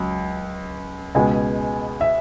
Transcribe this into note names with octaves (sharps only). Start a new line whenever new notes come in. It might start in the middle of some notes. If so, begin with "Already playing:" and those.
Already playing: C#2 F#3
C#2 B2 G#3 B3 G#5
E5